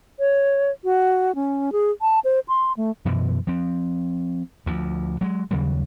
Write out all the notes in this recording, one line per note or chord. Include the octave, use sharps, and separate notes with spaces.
C#5
F#4
C#4
G#4
A5
C5
C6
A3
F#2 B2 E3 F3
F3 C4
D2 F3
F#3 G#3
D#2 C#3 F#3 G3